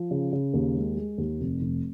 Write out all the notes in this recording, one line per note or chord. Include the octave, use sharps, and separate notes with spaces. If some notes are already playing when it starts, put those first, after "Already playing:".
Already playing: F3
C#3
C#3
D#2
G#3
G#3
D#2
F1
F1